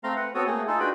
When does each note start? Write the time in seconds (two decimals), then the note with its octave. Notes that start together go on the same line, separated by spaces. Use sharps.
0.04 A3 C4 F5 A#5 C6
0.16 B4 F#5
0.34 B3 C4 F#4 A4 C#5 D#6
0.46 A3 A#3 G#4
0.67 D#4 F4 G#4 A4
0.80 D4 F4 F#4 B4 G5 B5